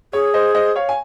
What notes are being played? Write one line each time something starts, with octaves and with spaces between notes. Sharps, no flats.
G#4 C#5
C5 D#5
C5 D#5
C#5 F5
G#5